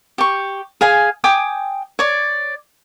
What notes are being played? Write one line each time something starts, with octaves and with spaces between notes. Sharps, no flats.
G4 C#6
G#4 F5 G#5
G5 G#5 D6 D#6
C#5 D5